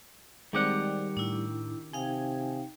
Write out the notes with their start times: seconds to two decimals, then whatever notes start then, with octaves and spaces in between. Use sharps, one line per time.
0.53 D#3 G3 G#3 C4 G4 D5 F#5
1.17 A2 D4 E4
1.93 C3 D#4 F5 G5 G#5